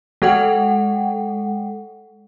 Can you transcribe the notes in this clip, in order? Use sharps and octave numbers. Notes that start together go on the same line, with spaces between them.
G#3 A4 F#5 G5